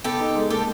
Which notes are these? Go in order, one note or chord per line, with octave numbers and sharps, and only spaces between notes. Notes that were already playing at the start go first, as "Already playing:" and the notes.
B3 G4 A4
D#4
G#3
A#3 G4 A4